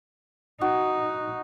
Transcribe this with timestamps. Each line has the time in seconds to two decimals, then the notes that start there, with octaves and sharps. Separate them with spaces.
0.61 D#4 F#4